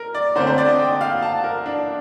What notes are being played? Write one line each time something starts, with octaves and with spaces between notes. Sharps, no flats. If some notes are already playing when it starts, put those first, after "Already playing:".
Already playing: A#4
D5
D3 A3 C4 C5
C5
D5
D#5
G5
F5
A5
A#4
D4